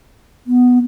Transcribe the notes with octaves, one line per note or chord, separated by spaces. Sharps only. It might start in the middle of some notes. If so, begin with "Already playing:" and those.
B3